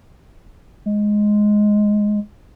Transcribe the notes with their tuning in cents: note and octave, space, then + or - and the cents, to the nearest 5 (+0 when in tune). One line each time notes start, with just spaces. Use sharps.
G#3 +5